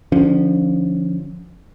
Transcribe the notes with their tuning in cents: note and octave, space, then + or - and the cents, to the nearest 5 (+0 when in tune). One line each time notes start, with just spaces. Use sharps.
D3 +30 F3 +0 C#4 +0